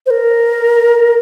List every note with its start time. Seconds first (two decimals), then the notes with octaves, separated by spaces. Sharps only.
0.06 C5
0.10 A#4